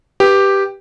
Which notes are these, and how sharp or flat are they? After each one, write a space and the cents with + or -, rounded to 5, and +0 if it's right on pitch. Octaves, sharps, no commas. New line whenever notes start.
G4 +0 B4 -10